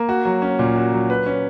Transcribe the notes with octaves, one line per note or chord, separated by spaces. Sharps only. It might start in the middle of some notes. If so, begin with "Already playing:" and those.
Already playing: A#3
F#4
F#3
C#4
A#2
F#4
F#3
B4
C#4